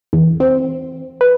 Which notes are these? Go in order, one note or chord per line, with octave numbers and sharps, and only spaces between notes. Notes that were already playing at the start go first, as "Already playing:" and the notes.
E2
C4
B4